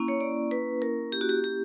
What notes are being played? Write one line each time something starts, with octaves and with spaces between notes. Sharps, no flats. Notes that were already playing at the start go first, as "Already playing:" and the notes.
Already playing: A#3 C#4 E4
C#5
D5
B4
A#4
G4
F#4
G4
G4